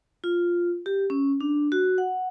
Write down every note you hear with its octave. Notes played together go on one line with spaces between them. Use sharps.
F4
G4
C#4
D4
F#4
F#5